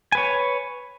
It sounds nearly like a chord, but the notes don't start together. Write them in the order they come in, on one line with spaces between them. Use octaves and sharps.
G#5 B4 C#5